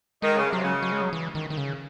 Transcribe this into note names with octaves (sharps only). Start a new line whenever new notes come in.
D#3 G#3
C#3
C3 F#3
C#3
F#3
G#3
F#3
E3
D#3
D#3
C#3